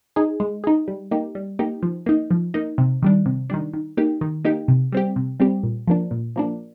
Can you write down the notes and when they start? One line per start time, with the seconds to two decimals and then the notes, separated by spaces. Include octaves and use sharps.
0.16 D#4 G#4
0.40 G#3
0.64 D#4 G#4
0.88 G3
1.11 A#3 D#4 G4
1.35 G3
1.59 A#3 D#4 G4
1.83 F3
2.06 A#3 D#4
2.31 F3
2.54 A#3 D#4
2.78 C3
3.02 D#3 G3 D4
3.26 C3
3.50 D#3 G3 D4
3.73 D#3
3.97 A#3 D#4 G4
4.21 D#3
4.45 A#3 D#4 G4
4.68 C3
4.92 G3 C4 G4
5.16 C3
5.40 G3 C4 G4
5.63 A#2
5.88 F3 A#3 D4
6.11 A#2
6.36 F3 A#3 D4